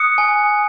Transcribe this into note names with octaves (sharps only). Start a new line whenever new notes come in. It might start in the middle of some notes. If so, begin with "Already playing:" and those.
Already playing: D#6 F#6 C#7
G#5